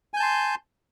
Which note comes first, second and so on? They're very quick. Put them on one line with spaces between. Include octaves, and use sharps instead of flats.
G#5 G6 A5 C6